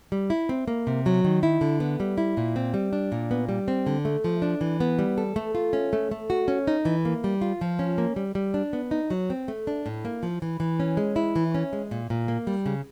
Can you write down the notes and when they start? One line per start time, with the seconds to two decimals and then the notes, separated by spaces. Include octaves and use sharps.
0.12 G3
0.30 E4
0.49 C4
0.68 A#3
0.87 C3
1.06 F#3
1.24 D#3
1.43 E4
1.61 D3
1.80 B3
2.00 G3
2.18 E4
2.37 A#2
2.56 C4
2.74 G3
2.93 D4
3.12 A#2
3.31 B3
3.49 G3
3.68 C4
3.87 D3
4.05 A3
4.24 F3
4.42 D4
4.61 E3
4.80 B3
4.99 G3
5.18 A4
5.36 A3
5.55 F4
5.73 C#4
5.93 A3
6.11 A3
6.30 F#4
6.48 C#4
6.67 D#4
6.85 E3
7.05 A#3
7.24 G3
7.41 F4
7.61 F3
7.79 C#4
7.98 A#3
8.16 G3
8.35 G3
8.54 D4
8.73 B3
8.91 D#4
9.10 F#3
9.30 C4
9.48 A3
9.67 D4
9.86 A2
10.05 A#3
10.23 F3
10.42 E3
10.60 E3
10.80 C#4
10.97 G#3
11.16 E4
11.36 E3
11.55 C#4
11.73 G#3
11.91 A#2
12.10 A#2
12.28 A#3
12.47 G3
12.66 C#3